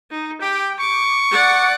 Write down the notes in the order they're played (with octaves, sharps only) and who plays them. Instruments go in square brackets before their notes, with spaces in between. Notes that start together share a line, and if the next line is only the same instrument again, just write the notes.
[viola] D#4
[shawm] G4 [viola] G5
[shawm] C#6 [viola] D6
[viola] D5 F#5